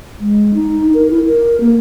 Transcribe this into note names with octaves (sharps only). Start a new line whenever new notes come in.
G#3
D#4
A#4
E4
A#4
A#3